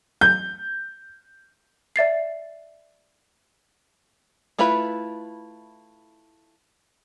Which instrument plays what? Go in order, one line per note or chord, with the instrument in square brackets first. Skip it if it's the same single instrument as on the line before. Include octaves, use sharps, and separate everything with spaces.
[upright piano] G6
[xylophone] D5 E5 A6 C7
[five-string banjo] A3 E4 F4 B4 B5